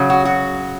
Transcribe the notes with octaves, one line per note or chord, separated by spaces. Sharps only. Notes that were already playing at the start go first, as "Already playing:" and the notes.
Already playing: C#3 F#3
F#4
F#4